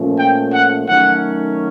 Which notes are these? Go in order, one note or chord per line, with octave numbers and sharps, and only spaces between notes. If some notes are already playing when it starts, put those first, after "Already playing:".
Already playing: A#2 F3 A3 C#4
G5
F#5
D#3 F#3 A3 C#4 F#5